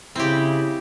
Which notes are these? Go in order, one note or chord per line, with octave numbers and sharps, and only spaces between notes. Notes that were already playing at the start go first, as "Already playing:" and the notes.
C#3 C4 E4 G4